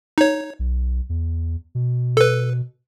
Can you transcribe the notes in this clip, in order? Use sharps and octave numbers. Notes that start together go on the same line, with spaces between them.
D#4 C#5
B1
E2
B2
A4 B4